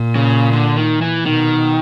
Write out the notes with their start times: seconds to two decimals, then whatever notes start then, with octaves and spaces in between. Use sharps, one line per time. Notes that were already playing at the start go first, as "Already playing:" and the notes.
Already playing: A#2
0.16 C#3
0.52 D3
0.76 D#3
1.01 E3
1.26 B2 D#3